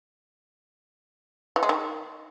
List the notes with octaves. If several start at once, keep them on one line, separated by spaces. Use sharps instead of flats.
E3
G#3
D#3